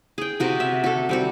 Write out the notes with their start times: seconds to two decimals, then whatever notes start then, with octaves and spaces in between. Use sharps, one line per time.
0.18 G#4 G5
0.40 C3 F#4 A#4
0.60 E5
0.84 F#4 A4
1.09 G3 C4 F#4